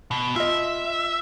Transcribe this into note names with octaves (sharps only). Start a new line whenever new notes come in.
B2
F4 D#5 E5